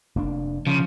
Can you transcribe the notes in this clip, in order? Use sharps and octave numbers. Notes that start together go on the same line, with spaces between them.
F1 A#3 D4
C#3 F3